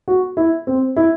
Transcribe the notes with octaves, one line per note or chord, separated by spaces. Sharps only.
F#4
E4
C4
E4